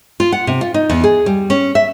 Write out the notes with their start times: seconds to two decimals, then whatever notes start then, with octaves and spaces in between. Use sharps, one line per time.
0.20 F4
0.32 F#5
0.47 C3
0.61 F4
0.74 D#4
0.90 E2
1.04 G#4
1.26 G3
1.50 C#4
1.75 E5